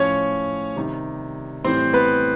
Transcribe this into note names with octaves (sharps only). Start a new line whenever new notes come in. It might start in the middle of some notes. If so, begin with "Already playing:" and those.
Already playing: A2 F3 C#4 C#5
C3 D#3 G3
A2 E3 G3 C4 C5
B3 B4